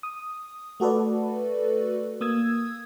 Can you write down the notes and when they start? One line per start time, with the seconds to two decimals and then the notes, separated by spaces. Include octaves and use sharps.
0.03 D#6
0.80 A3 F#4 A4 B4 D5
2.21 A#3 D#6 E6 G#6